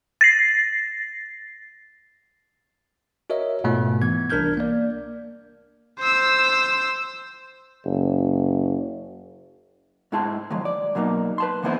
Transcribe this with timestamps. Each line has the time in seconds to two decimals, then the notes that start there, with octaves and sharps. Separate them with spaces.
0.21 A6 A#6 C7
3.30 F#4 A#4 C#5 D#5 E5
3.64 G#2 B2 A3 F4
4.02 E3 B3 G#6
4.30 C2 D4 A#4 F6 G6 G#6
4.57 A#3 D5
5.99 C5 E6
7.85 F#1
10.12 G#2 G#3 E4 G#4 A5 C6
10.50 D#3 F3 F#3 G#3
10.65 D5
10.95 B2 F#3 A#3 D#4
11.38 B4 A5 C6
11.63 D3 E3 A#3 B3 E4 C5